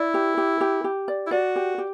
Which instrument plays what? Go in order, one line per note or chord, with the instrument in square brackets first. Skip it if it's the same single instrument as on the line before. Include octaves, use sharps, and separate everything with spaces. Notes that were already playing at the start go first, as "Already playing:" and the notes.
Already playing: [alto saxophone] E4 [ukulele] D5
[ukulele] G4
G4
G4
G4
D5
[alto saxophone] E4
[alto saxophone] F#4 [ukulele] D5
[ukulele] G4
G4